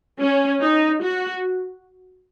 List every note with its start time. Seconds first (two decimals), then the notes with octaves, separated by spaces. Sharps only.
0.20 C#4
0.61 D#4
1.02 F#4